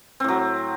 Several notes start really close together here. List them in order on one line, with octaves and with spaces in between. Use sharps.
C4 A2 F#3